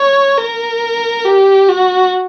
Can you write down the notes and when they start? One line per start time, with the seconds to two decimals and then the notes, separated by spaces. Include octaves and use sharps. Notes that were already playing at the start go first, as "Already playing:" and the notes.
Already playing: C#5
0.38 A#4
1.25 G4
1.69 F#4